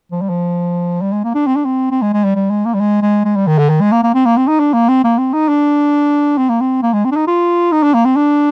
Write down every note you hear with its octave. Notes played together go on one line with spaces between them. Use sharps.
F3
G3
F3
G3
G#3
A#3
D4
C4
D4
C4
C4
G#3
G#3
G3
G3
G#3
A#3
G3
G#3
G#3
G#3
G3
D#3
D3
D#3
G#3
A#3
A#3
C4
A#3
C4
D#4
D4
A#3
C4
A#3
C4
D#4
D4
C4
A#3
C4
A#3
G#3
C4
D4
D#4
F4
D#4
D4
A#3
C4
D4